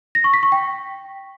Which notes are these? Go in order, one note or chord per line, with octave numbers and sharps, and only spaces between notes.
A#6
C#6
B6
C#6
G5